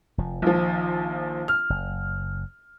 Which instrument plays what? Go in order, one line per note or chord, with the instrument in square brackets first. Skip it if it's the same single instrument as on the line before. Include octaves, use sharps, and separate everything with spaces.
[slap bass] F1 F3
[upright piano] A#1 F3 [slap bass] D#3
[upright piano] F6
[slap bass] F#1